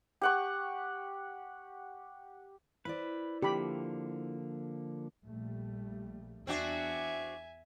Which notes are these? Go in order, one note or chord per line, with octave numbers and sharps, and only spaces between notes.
G4 F#5 C#6
E4 B4 C5 D5
D3 F3 A#3 G4 B5
A#1 G3 A3
E2 C4 D4 F#4 E5 G#5